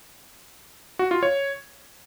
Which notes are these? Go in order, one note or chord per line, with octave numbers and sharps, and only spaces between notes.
F#4
F4
C#5